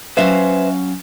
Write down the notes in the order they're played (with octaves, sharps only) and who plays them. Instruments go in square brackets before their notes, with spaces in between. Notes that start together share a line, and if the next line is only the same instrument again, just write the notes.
[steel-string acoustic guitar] F#3 C#4 F5 [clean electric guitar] B4 C5 E5